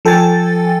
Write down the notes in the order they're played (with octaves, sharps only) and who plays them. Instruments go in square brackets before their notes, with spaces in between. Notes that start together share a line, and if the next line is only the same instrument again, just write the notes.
[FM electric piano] F3 A4 G5 G#5 A6